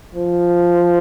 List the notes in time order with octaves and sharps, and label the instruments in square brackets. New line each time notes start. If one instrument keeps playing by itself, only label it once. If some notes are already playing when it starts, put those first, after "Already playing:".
[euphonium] F3